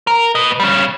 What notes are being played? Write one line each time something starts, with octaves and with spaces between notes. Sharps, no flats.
A#4
B4 D#5
G3 C#4